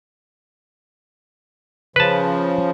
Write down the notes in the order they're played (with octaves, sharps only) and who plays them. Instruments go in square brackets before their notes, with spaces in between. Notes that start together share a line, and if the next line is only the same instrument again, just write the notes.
[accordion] C#3 F3 [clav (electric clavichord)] B4 A5